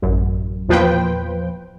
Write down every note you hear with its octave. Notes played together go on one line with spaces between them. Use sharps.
A1 F#2
E2 A#2 F3 B4 C5 G5